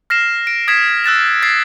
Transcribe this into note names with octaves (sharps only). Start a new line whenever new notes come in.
F6 A#6 C7 E7
D7
D#6 G#6 B6 C7 E7
E6 F#6 A6 E7
G#6 A6 B6 C7